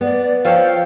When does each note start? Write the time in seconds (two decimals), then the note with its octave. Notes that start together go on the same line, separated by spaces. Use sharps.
0.01 B3 D5
0.45 F3 A4 C#5 F5 G5